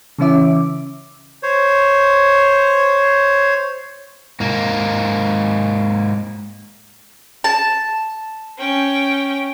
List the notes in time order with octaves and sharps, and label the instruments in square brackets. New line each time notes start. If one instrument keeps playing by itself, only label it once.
[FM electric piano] C#3 E3 C#4 E5 D6
[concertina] C5 C#5
[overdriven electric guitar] G#2 A#3
[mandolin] A5
[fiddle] C#4 G5